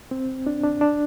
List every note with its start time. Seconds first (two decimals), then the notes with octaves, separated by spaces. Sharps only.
0.11 C4
0.47 D4
0.64 D4
0.81 D4